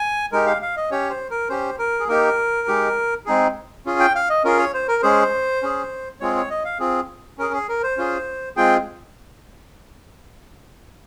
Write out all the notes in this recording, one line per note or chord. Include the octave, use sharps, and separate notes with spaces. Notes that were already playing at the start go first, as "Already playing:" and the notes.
Already playing: G#5
G#3 D#4 G4 A#4
F5
F5
D#5
C#4 G4 C#5
C5
A#4
C#4 G4 C5
A#4
G#4
A#3 D#4 G4 A#4
G#3 D#4 G4
G#3 C4 D#4 G#4
C#4 F4 G#4
G5
F5
D#5
C#4 F4 G#4 A#4
C#5
C5
A#4
G#3 C#4 G#4 C5
C#4 G#4
G#3 C4 F4 G#4 C#5
C#5
D#5
F5
C4 F4 G#4
C#4 G#4 A#4
G#4
A#4
C5
C#4 F4 G#4
G#3 C4 F4 G#4 G5